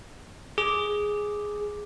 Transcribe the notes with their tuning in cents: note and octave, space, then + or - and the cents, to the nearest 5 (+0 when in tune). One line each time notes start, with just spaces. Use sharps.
G#4 +0 D6 +0